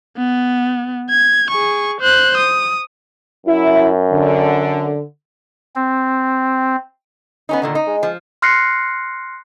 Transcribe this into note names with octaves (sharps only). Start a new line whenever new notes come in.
B3
G#6
G#4 C#6
C5 F#6
D#6
F#2 E4
D3
C4
B3 C#4 D#4
A#2 D3 D#3
D#4
G#3
F3
C6 F6 F#6 A#6 C7 C#7